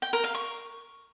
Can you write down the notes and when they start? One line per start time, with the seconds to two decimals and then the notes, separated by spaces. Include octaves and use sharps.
0.02 G5
0.13 A#4
0.24 F5
0.35 C#6